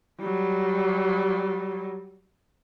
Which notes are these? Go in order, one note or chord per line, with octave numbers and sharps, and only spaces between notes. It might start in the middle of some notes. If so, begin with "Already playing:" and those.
F#3 G3